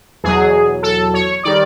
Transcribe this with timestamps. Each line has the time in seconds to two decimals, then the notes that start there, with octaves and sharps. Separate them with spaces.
0.24 E2 B2 F#3 G#4
0.83 A4
1.14 C#5
1.43 D#3 G3 D5